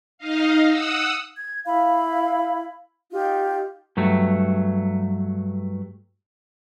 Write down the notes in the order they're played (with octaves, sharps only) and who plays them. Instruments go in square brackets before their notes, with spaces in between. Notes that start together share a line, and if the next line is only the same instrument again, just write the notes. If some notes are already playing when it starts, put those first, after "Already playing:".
[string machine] D#4 D#5 F5
F#5 D#6 E6
[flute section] G#6
E4 F5 B5
D#4 F4 G4
[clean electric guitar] G2 F#3 A3